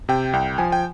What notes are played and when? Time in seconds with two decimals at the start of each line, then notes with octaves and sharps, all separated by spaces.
0.09 C3 G5
0.33 C2 G5
0.58 F3 G#5
0.72 G5